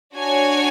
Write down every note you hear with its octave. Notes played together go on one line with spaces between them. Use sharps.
D4 F#4 C#5 G#5